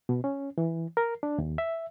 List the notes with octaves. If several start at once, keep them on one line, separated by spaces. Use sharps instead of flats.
B2
C#4
E3
A#4
D4
D#2
E5